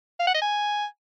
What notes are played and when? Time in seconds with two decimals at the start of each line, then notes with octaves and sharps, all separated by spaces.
0.20 F5
0.27 F#5
0.34 D#5
0.42 G#5